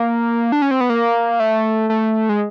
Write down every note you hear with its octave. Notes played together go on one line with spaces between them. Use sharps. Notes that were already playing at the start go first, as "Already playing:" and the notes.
Already playing: A#3
D4
C#4
C4
B3
A#3
A3
A3
G#3